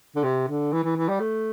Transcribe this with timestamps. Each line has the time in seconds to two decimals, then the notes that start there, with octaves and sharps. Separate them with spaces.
0.15 D3
0.24 C3
0.49 D3
0.72 E3
0.84 E3
0.96 E3
1.09 G3
1.20 A3